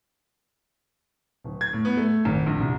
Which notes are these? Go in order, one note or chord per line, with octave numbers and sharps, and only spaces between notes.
D1
G#6
A2
B3
A3
G#1
A#1
C2